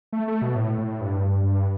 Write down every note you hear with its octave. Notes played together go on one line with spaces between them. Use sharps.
A3
A3
B2
A2
A2
G2
G2